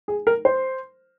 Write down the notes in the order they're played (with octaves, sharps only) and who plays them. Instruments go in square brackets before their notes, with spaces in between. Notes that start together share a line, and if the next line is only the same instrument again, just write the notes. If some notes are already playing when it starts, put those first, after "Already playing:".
[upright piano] G#4
A#4
C5